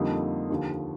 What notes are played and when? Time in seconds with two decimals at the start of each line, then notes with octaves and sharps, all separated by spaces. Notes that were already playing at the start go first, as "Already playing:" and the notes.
Already playing: F2 D3 G3 A#3 D#4
0.50 D#2 D3 F3